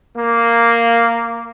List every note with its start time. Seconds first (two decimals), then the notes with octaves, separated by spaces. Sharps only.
0.16 A#3